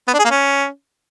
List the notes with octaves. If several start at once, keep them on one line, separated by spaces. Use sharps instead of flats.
B3
D4
G#4
A#3
C#4